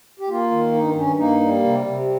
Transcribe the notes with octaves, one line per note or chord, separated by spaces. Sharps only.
G4
A#3 F4
D#3
G2 D#4
G2 C#4
A#3 D#4
G3
C3
C3